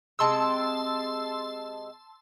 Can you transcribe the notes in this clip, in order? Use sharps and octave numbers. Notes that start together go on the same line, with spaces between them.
C3 G#3 C4 A5 C6 E6